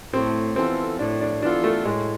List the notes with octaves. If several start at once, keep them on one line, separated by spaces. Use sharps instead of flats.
A2 C4
E3 B3 C4 F4 A4
A2 D4
D4
E3 B3 D4 F4 A4
A3
A2 G#3